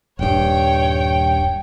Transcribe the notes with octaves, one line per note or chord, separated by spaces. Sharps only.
D#1 G2 C#5 G5